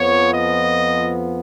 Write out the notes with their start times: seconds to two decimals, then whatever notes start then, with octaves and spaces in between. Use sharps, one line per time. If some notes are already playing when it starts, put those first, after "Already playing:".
Already playing: F2 F3 B3 C#5
0.34 D#5